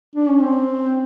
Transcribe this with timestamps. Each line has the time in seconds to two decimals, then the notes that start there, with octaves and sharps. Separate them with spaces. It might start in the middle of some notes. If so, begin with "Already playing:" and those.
0.16 D4
0.29 C#4
0.42 C4